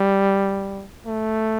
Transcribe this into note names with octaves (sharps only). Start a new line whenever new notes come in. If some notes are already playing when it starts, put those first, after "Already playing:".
Already playing: G3
A3